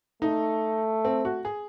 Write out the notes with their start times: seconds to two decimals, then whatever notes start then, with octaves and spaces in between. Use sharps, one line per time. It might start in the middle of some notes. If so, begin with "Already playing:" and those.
0.22 A3 D#4
1.05 C4
1.25 F#4
1.45 G#4